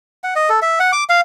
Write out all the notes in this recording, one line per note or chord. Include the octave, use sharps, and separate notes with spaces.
F#5
D#5
A4
E5
F#5
D6
F5